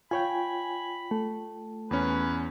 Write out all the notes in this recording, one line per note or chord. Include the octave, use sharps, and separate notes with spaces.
F4 C#5 G5 G#5 B5
A3
E2 C#4 B4